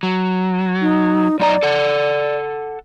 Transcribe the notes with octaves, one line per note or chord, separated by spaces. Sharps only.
F#3
D#4
F#2 D#4 D5 A#5
A4 F#5